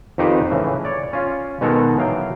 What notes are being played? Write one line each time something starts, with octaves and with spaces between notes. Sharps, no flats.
F2 D#3 D#4 G4 B4 C5
A2 C#3 E3
C#5 D5
C#4 F4
B2 D#3 G#3 B3 A4 A#4
E3 F#3 F5 G5